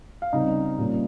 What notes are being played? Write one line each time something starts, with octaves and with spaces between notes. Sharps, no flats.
F5
C#3 G3 C4 D#4 D#5
A#2 G3 A#3 C#4